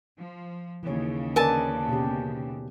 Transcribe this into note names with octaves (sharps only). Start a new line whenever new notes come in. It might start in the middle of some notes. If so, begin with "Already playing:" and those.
F3
D#2 C#3 E3 C#5
D3 A#4 B4 D5 G#5 A5
B2 G4